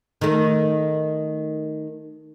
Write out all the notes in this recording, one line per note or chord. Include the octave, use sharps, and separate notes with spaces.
D#3 A3